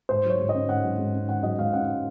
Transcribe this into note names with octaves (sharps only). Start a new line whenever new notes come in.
G#2 C5
F#3 C#5
G#2
D#5
C#4
G#2 F#5
F#3
G#2
C#4
G#2 F#5
F#3 D#5
G#2 F5
C#4 F#5